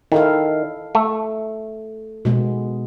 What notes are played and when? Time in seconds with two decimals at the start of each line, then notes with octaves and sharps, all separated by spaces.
0.12 D#3 E4 A4 F5
0.95 A3
2.25 B2 G#3 B3